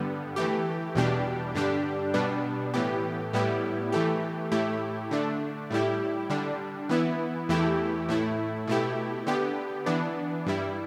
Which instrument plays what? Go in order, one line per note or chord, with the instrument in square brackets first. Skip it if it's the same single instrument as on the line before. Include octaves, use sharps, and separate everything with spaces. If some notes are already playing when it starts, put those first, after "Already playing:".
Already playing: [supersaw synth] G2 D3 G3 B3
E3 A3 G4
E2 B2 G3 D4 G4
G2 D3 G3 D4 G4
B2 G3 B3 D4
A2 E3 B3 G4
A2 G3 B3 E4 G4
E3 A3 G4
A2 A3 E4 G4
D3 A3 D4
A2 G3 E4 G4
D3 G3 D4
E3 B3 E4
E2 E3 A3 E4 G4
A2 A3 E4
B2 A3 E4 G4
D3 B3 G4
E3 B3 D4
G2 G3 E4